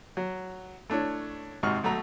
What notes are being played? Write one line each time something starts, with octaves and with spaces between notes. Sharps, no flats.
F#3
A3 D4 E4 C#5
G#1 G#2 C3 F#4 C#6 F6
B1 A3 F#4 A#5